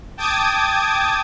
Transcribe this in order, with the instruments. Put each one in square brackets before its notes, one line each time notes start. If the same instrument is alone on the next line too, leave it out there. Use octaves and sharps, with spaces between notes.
[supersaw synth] G5 A5 D6 D#6 G#6